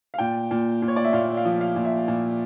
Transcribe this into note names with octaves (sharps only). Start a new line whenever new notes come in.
F5
A#2 G5
A#2
A#2
C#5
D5
E5
A#2 F5
F5
F3
F5
A#2
E5
A#2